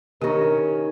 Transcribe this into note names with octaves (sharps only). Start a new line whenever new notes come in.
D#3 C#4 D4 G4 A#4